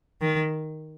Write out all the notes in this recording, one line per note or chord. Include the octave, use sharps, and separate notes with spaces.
D#3